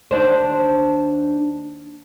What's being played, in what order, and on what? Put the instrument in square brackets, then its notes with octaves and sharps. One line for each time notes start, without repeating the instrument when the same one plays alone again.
[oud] D#2 D4 C5